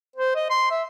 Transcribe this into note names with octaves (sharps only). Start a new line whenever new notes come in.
C5
D#5
C6
E5